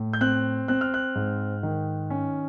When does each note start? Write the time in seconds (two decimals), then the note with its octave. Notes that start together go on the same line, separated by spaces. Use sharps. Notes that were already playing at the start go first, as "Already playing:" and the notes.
Already playing: A2
0.13 G6
0.21 C4 F#6
0.68 C4 F#6
0.81 F6
0.94 F#6
1.15 G#2
1.63 D#3
2.10 C#4